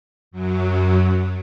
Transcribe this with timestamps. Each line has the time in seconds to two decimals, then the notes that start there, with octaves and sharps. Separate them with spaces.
0.31 F#2 F#3